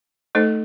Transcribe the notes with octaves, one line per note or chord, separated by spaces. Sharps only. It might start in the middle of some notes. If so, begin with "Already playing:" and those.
A3 D#4 A4 C5 D#5